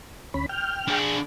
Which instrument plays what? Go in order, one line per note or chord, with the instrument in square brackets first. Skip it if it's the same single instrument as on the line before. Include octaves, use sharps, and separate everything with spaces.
[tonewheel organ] D2 C#4 B5
G5 F6
[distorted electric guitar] D4 G#4